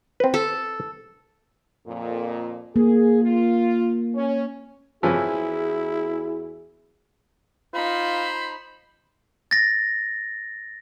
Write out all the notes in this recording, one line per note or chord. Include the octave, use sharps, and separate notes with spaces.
C4 B4
A4
F2 A#2
A#3 G#4
F4
C#4
E2 C#3 E3 F3 E4 F#4 G#4
D#4 F4 C5 B5
A6 A#6